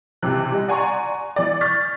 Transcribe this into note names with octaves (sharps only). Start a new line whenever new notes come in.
C#2 C3 E3 F#6
G3 D#5
D5 F#5 G#5 A#5 C6 C#6
E3 D5
C#6 F6 G6 A6 B6